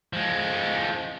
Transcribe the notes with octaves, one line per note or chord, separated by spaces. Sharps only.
F3 G#3